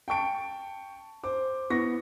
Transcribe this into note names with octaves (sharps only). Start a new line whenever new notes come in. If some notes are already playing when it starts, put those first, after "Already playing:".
G5 A5 C#6 D7
C5 D6
B3 E4 C#6 A#6